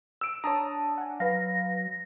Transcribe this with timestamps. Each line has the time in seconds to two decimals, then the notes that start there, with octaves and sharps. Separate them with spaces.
0.21 E6 D7
0.44 D4 C#5 A5 A#5 D#6
0.98 F#5 G#5
1.20 F#3 B4 F5 A#6